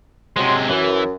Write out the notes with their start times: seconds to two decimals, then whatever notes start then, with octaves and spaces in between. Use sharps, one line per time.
0.36 C3 F#3 G#3 C6
0.68 F#2 E3